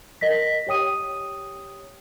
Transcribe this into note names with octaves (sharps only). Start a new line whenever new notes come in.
A#4 D#5 A#6 B6
G4 C#5 G5 D#6 D#7